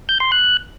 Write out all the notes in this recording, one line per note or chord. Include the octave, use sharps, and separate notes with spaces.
G6
C6
F#6